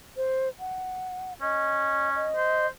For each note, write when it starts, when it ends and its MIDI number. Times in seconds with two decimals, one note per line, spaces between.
0.17 0.49 72
0.60 1.33 78
1.42 2.29 61
1.42 2.09 75
2.15 2.67 75
2.36 2.67 72